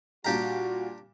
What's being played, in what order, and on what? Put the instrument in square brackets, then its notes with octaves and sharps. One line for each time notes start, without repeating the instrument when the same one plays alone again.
[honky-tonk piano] A#2 G3 F5 [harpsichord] D4 G4 A#5 [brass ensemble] F#4